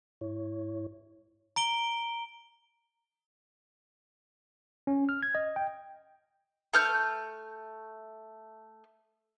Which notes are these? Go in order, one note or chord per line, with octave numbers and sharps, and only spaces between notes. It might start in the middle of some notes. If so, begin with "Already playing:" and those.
G#2 E4 C#5
A#5 D7 G7
C#4
F6
G#6
D#5
G5
A3 F6 G6